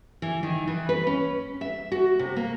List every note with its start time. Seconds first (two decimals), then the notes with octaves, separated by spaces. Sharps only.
0.22 E3
0.43 D#3
0.67 E3
0.89 B4
1.07 C#4
1.61 E5
1.92 F#4
2.19 C3
2.36 A#3